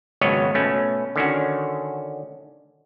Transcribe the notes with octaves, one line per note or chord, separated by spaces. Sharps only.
G#1 C#2 F#3 B3 C#5 D#5
B2 A3 C#4
D3 D#3 C#4 F#4